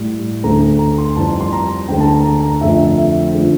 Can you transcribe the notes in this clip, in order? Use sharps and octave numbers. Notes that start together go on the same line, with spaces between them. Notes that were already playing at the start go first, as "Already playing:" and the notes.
Already playing: A2 G3
D2 D3 A3 A#5
A#5
C6
F2 E3 G3 A5
C6
A#5
D2 D3 A3 G5
A5
A#5
A#5
A#5
F2 D3 F3 A3 E5
E5
D3 F3 A3